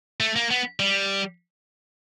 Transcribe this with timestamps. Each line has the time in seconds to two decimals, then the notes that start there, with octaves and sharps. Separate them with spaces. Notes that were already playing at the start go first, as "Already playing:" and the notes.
0.20 A3
0.36 A#3
0.51 B3
0.80 G3